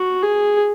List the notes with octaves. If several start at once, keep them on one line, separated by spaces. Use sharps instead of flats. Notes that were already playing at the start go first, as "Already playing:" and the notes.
Already playing: F#4
G#4